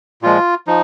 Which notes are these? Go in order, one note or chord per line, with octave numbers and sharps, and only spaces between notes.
A#2 F3 G#3 F4
F3 D#4